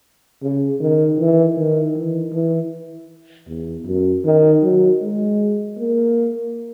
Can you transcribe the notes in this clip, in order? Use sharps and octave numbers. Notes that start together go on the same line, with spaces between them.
C#3
D#3
E3
D#3
E3
E3
E2
F#2
D#3
F#3
G#3
A#3